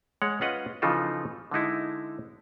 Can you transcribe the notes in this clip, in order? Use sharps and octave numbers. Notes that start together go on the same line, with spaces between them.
G#3 C#5 F#5
C#4 F4 B4 D#5 F#5
C#3 E3 F3 D#4 F4 A4
D3 G#3 D#4 E4